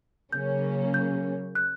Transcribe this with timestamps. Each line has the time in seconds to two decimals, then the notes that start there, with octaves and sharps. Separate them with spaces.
0.33 C#3 F#3 A#3 C#4 G6
0.94 G6
1.55 F#6